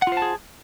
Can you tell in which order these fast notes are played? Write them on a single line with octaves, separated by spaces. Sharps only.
F#5 F4 C5 A5 G#4